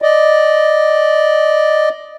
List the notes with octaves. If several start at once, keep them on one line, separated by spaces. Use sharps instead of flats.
D5 D#5